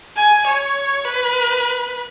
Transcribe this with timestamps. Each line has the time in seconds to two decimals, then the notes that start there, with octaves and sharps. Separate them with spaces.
0.16 G#5
0.46 C#5
1.05 B4